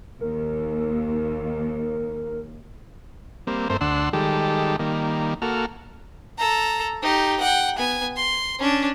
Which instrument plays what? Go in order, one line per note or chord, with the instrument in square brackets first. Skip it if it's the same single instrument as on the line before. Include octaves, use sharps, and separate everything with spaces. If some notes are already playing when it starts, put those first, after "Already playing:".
[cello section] D#2 [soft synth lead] A#4
[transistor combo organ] G3 A#3 C4
G2 A3 C4 A#4 C5
D2 D4 F#5 C6 E6
D#3 G3 G#3 G4 A4
D#3 G3 A#3
A#3 F#4 A4 F6
[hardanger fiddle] A4 A#5
D#4 G4
F#5 G5
B3 G#5
C6
C#4 D4